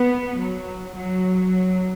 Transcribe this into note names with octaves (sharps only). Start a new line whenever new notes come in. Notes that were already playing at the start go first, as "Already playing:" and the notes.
Already playing: B3
F#3
F#3